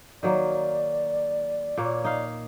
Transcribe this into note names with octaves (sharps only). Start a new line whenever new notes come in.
D#3 F#3 A#3 D5
A#2 A#3 C#5
D#4 F5